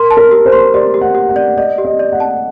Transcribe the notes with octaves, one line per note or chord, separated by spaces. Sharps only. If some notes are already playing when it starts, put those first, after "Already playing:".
Already playing: A#4 C6
A5
A#4
G4
C5
C6
G4 D5
G4
F#5
G4
F#5
D5
D5 D#5
G4
D#5
D5
F#5
A5